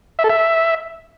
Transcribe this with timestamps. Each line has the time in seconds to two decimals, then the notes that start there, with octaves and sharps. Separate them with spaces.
0.19 E5
0.24 A4
0.29 E5